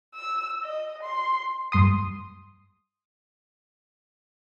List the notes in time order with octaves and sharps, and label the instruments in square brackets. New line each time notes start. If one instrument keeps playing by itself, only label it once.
[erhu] E6
D#5
C6
[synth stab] G2 C6 D#6